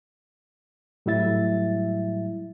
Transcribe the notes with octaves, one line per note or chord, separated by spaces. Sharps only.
A2 F#3 G3 E4 E5 A6